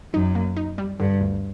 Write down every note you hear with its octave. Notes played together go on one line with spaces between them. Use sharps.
F#2 D#4
A#3
D#4
G3
G2 D3
D2